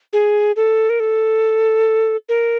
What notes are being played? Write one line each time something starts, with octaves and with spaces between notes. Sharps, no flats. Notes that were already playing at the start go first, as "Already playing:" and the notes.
G#4
A4
A#4
A4
A#4